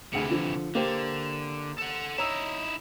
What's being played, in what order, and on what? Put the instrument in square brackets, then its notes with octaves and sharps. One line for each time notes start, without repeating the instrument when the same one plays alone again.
[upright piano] D2 G#4 C#7 [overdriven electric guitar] C3 E3
[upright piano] D3 F3
[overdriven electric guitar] D3 [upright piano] A#3 G4 C5
[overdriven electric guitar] A4 F#5
[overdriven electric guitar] D#4 E4 [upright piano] C#5 A#5 E6